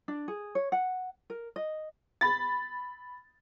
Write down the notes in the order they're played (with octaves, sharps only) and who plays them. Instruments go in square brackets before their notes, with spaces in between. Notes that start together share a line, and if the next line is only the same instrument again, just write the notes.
[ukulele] D4
G#4
C#5
F#5
A#4
D#5
[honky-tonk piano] B5 A6